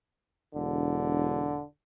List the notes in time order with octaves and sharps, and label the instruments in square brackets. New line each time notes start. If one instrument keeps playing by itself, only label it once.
[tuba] E1 [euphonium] D3